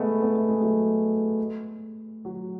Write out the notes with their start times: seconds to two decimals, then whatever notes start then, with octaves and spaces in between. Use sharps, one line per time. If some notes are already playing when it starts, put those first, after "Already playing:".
Already playing: G#3 A3 B3
0.22 B3
0.36 A3
0.49 G#3
0.61 F#3 A3
2.25 F#3